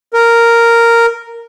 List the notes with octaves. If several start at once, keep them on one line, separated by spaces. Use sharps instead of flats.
A#4